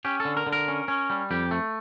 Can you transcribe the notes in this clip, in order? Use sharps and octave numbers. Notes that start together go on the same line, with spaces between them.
C#4 G4
A4
D3
A#4
D3
A#4
C#4
C#4
G3
F2 G4
A3